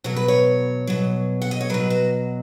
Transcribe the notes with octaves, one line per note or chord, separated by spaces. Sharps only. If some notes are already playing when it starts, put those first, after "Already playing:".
B2 F#3 C#5
B4
C#5
B2 F#3
F#5
D#5
C#5
B2 F#3 B4
F#4